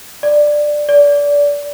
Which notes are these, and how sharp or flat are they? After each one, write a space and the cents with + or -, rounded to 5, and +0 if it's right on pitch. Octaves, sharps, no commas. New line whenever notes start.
D5 +10
D5 -25